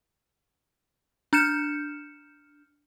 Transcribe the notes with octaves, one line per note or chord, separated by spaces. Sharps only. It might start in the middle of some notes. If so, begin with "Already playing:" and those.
D4 F6 G6 C#7 E7